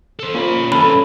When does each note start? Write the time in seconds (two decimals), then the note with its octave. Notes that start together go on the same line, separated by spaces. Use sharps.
0.20 A4 C5
0.35 A#3 C#4 F4 C5 B5
0.72 G2 E3 C#4 A4 B5